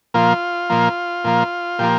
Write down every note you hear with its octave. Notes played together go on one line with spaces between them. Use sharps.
A#2 F3 A#3 F4
A#2 F3 A#3
A#2 F3 A#3
A#2 F3 A#3 G4